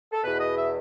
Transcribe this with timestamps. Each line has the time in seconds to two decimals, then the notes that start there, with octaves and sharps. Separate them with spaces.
0.12 A4
0.23 E2 B2 B4
0.40 D#5
0.57 E5